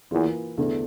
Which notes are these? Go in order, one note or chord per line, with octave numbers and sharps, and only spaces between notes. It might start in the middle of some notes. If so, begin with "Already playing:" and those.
E2 E3 A#3 F4
E2 D3 A3 D4